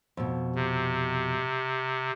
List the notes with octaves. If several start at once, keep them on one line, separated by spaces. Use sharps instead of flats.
F2 B2
C3